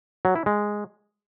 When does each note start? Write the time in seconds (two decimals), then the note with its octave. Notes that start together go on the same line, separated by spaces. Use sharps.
0.25 F#3
0.36 E4
0.46 G#3